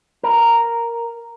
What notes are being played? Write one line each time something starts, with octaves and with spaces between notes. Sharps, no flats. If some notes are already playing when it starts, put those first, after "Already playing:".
A#4